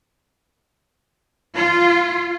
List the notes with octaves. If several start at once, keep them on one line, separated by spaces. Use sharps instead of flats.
F4